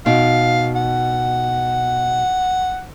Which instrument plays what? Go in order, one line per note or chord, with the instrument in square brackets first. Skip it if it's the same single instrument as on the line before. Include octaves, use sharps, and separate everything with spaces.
[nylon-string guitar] B2 D#4 [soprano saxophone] F5
[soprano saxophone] F#5